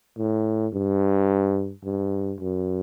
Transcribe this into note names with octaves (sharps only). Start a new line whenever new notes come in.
A2
G2
G2
F#2